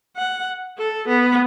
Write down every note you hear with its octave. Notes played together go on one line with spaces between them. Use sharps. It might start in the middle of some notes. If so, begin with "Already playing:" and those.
F#5
A4
B3